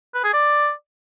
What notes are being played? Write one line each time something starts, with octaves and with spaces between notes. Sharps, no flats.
B4
G#4
D5